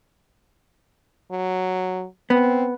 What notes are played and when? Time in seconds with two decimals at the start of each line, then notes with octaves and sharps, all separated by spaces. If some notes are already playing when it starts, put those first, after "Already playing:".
1.31 F#3
2.30 B3 C4